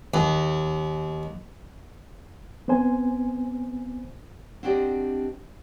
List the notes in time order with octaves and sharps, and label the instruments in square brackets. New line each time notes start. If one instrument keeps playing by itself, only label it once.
[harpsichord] D#2
[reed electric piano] B3 C4 C5 G#5
[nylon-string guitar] C4 D4 F#4 G4 D5 D#5